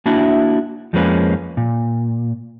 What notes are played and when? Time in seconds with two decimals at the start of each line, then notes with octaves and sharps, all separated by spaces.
0.06 A#3 D4 E4 F#4 E5
0.93 F2 F3 G#3 A#3 C#4 B4
1.57 A#2